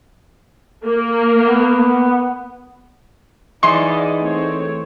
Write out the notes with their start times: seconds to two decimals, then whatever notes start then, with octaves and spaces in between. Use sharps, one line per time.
0.86 A#3
1.46 B3
3.63 E3 D#4 E4 G#4 D5 D#5 C6 D#6
4.20 A3 C4 C#5